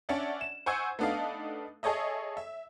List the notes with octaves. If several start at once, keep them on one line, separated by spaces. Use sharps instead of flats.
C#4 D4 D5 E5 F#5
E7
C5 F#5 G#5 C#6 E6 G#6
A3 B3 D4 D#4 F5
G#4 A4 C#5 D#5 E5
E5